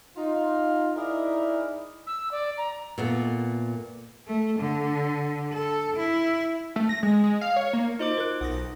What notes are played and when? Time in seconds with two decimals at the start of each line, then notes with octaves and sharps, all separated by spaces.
0.16 D#4 F4
0.96 D#4 E4 G#4 A#4 D5 E5
2.07 E6
2.31 D5
2.58 A#5
2.98 A#2 A3 B3
4.27 A3
4.60 D3
5.53 A4
5.96 E4
6.76 A3
6.89 A#6
7.03 G#3
7.24 G#3
7.41 F5
7.56 C#5
7.73 A#3
7.99 D#4 F4 F#4 C5 D#5 D6
8.17 A#4 F#6
8.41 B1 F#5 D#6 A#6